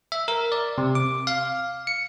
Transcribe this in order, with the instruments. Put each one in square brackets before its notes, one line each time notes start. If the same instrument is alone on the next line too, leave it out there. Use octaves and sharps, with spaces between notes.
[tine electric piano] E5
A#4
D5
C3
D6
F5
C#7